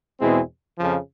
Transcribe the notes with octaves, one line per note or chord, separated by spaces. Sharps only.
E2 B2 G#3 C4 E4
F2 C#3 F3